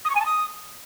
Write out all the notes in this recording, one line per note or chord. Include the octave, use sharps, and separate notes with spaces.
D#6
C#6
G#5
A5
D#6